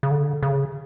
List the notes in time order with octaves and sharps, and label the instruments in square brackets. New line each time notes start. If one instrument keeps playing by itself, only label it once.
[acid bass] C#3
D3
C#3